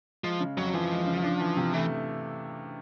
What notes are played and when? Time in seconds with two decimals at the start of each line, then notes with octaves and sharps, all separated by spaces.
0.24 F3 G#3
0.40 C#3
0.57 F2 F#3
0.74 E3 F3
0.91 G#3
1.07 C#3
1.24 D4
1.40 E3
1.57 C3
1.73 E3 A3